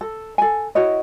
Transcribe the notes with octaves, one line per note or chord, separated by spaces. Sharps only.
A4
A4 G#5
E4 F#4 C#5 D#5